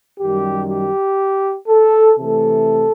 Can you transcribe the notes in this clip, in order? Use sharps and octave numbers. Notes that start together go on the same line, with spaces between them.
F#2 D#3 G3 G4
G4
A4
C3 E3 A3 A4